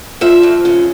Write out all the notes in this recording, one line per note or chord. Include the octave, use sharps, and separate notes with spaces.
F3 E5
F2
C#3